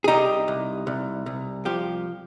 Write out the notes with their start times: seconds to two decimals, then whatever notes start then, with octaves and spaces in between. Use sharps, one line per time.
0.04 G#4
0.08 C2 D#4 G4
0.48 C2
0.87 C2
1.26 C2
1.65 F3 G4